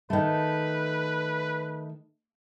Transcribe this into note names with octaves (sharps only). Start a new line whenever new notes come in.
D#3 A3 B4